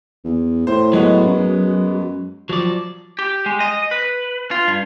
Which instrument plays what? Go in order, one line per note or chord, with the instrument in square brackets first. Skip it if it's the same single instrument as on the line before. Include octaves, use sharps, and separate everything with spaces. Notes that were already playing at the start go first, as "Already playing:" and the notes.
[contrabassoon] E2
[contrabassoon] A2 [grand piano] C5
[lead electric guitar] F#3 [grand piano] G#3 B3
[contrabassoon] F#2
[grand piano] F3 [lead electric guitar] F#3 D5
[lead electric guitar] G4
G#3
D#5
B4
F4
G2